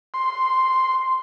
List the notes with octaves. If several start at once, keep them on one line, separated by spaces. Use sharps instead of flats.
C6